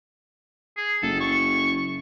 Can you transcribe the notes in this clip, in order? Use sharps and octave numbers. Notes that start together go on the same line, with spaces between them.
G#4
F#1 A4
C#6